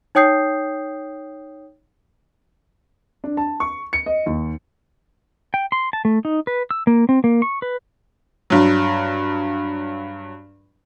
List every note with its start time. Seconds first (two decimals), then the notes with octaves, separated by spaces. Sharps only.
0.15 D#4 C#5 G5 D#6 G6 C7
3.24 D4
3.37 A5
3.60 C#6
3.93 C#7
4.06 D#5
4.26 D#2
5.54 G5
5.72 C6
5.93 A5
6.05 A3
6.25 D#4
6.47 B4
6.71 E6
6.87 A#3
7.09 C4
7.24 A#3
7.42 C#6
7.62 B4
8.50 G2 F#3